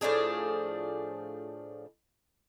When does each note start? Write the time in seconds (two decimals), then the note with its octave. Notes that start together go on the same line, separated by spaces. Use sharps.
0.01 A2 F3 D4 G#4